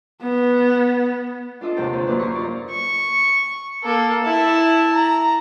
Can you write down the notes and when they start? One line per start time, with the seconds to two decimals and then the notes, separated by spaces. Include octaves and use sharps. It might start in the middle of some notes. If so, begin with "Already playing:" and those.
0.23 B3
1.61 D4 F4 A4 D#5 D6
1.77 D#2 G#2 C3 G4 A#4 G5
1.93 D#2 D3
2.05 F#2 A#3 D4 F4 B4
2.19 A#5 C6 C#6
2.35 D#4 D5
2.70 C#6
3.84 A#3 A4
4.24 E4 A5
4.94 A#5